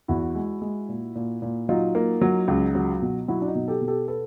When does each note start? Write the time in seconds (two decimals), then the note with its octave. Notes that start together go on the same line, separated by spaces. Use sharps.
0.08 E2 E4 F#4
0.35 G#3
0.61 G#3
0.89 A#2
1.15 A#2
1.42 A#2
1.69 F#3 D#4 F4
1.95 A#3
2.21 F#3
2.48 C#2
2.75 F#3
3.02 B2
3.28 F#3 E4 F#4
3.42 D4
3.48 D#4
3.55 B2
3.68 G4 A4
3.81 B2
3.88 G4 A4
4.08 A4 B4